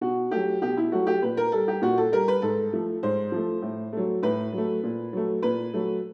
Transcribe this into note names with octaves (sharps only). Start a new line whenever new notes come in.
B2 F#4
F#3 A3 G4
B2 G4
E4
F#3 A3 F#4
G4
A#2 B4
A#4
G3 A4
G4
A#2 F#4
A4
G3 A#4
B4
G#2 A4
F3 A3
G#2 C5
F3 A3
A2
F#3 A3
A2 B4
F#3
A3
A#2
F#3 A3
A#2 B4
F#3 A3